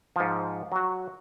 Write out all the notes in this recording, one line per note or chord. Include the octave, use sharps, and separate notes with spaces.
G#2 F3
F#3 F#4